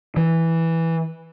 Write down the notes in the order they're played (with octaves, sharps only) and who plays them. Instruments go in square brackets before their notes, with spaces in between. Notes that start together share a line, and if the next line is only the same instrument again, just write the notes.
[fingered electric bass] E3